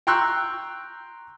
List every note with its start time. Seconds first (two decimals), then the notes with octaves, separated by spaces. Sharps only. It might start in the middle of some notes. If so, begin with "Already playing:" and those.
0.07 G5 A#5 C6 C#6 E6 F#6